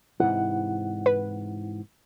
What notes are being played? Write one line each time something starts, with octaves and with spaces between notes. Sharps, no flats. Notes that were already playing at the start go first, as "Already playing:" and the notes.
G#2 C3 E3 E4 F#5
B4